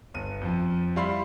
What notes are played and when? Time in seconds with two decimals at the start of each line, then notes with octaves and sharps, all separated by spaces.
0.14 G1 D#7
0.41 F2 F3
0.96 G3 E4 F5 B5 C6 C7